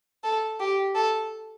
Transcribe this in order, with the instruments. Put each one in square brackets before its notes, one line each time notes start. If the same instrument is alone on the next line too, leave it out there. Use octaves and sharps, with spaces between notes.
[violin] A4
G4
A4